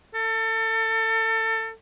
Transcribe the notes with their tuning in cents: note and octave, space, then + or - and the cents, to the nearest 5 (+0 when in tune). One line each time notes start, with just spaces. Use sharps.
A4 +30